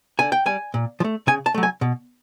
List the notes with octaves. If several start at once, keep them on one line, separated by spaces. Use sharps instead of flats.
D3 G#5
G5
G3 G#5
A#2
F3
A3
C#3 G#5
A5
F#3 A3
G#5
B2